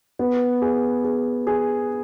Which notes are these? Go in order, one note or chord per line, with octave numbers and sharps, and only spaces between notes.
B3
G#4
G#4
G#4